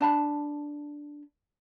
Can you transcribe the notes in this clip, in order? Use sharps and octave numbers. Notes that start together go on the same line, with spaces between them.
D4 A5 B5